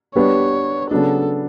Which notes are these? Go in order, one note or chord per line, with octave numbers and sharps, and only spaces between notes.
G3 B3 D4 G4 B4 C#5
C#3 F#3 B3 D4 A4